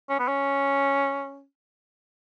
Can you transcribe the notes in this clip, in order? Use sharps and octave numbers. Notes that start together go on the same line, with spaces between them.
C#4
B3
C#4